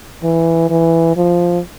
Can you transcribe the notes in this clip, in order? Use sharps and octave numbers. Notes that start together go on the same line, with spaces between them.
E3
E3
F3